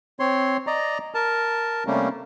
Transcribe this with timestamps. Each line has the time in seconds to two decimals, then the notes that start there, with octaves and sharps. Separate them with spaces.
0.20 C4 C#5 C6
0.67 D5 D#5 A#5
1.14 A#4 A5
1.87 C3 G3 A3 A#3 C#4